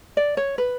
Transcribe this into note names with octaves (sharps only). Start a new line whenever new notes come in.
D5
C#5
B4